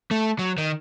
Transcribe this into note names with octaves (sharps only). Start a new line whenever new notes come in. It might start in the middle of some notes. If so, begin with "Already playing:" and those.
A3
F#3
D#3